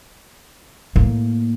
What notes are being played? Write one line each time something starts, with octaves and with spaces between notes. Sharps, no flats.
A2 A#3